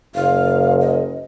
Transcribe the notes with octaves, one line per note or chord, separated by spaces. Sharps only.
F#1 F5
D#5